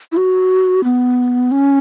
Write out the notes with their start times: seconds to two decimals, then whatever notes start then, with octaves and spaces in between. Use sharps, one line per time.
0.12 E4
0.17 F#4
0.84 B3
1.51 C#4